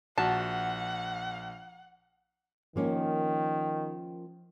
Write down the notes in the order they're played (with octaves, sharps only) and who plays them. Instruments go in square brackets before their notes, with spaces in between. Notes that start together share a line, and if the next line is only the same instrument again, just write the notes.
[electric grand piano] A#1 [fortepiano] F#4 [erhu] F#5 [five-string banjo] A5
[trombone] D#3 [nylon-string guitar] F3 A#3 C#4